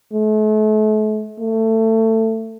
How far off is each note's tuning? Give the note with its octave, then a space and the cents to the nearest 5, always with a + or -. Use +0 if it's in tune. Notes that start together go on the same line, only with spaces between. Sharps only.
A3 -40
A3 +20